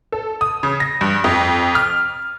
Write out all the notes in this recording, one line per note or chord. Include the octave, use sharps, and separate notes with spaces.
A4
D#6
C#3
A#6
G2
F2
F6